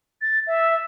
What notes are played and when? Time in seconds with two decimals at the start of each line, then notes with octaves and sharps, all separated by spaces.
0.22 A6
0.47 E5